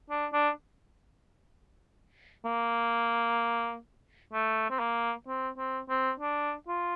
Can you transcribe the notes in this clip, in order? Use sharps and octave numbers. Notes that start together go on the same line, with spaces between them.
D4
D4
A#3
A3
C4
A#3
C4
C4
C4
D4
F4